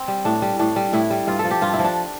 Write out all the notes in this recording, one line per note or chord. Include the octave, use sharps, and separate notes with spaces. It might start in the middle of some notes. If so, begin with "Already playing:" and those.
Already playing: C4
G3
A2 D4
G3
A2 D4
G3
A2 E4
G3
G2 F4
A4
F3
G4
G2 F4
E4
F3
D4